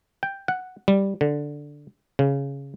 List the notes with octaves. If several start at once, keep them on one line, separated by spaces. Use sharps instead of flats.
G5
F#5
G3
D3
C#3